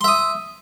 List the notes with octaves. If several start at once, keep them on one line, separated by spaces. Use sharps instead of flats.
E5 C6 D#6